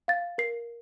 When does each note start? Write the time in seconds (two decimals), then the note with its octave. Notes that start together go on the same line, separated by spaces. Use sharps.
0.08 F5 A6
0.38 A#4 C7